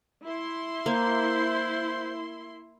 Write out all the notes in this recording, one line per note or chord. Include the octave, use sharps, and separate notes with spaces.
E4 C6
A#3 C5